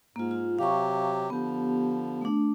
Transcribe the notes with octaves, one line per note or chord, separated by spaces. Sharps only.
G#2 A#3 F4
F4
C3 F#3 G4 F5 C#6
D3 F3 B3 G4
A3 D4